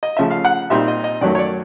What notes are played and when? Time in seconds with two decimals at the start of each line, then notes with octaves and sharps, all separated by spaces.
0.03 D#5
0.17 C#3 F3 A3 E5
0.31 F5
0.45 F#5
0.70 A#2 G3 C4 D#4 E5
0.88 D#5
1.04 D#5
1.21 F#2 D#3 F#3 A3 D5
1.35 C#5
1.39 D5